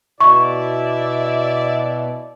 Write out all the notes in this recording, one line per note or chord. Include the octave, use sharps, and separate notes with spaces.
B2 E4 D5 E5 C#6